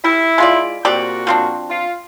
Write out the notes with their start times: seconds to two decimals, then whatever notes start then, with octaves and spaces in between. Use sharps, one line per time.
0.04 G3 E4
0.38 G#3 F4 D5
0.85 A#2 C4 F#4 G4 D5
1.27 F3 C4 D4
1.70 F4